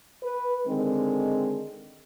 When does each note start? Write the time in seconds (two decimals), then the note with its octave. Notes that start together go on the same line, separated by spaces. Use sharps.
0.23 B4
0.67 D3 D#3 G#3 C4